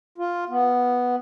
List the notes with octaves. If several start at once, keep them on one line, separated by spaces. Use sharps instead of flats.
F4
B3